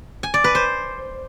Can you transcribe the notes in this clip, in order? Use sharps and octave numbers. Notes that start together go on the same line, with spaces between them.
G#5
D5
B4
C5